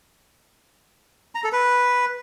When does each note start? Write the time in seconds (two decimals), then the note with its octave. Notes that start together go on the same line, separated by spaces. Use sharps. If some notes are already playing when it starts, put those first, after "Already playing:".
1.35 A#5
1.44 A4
1.53 B4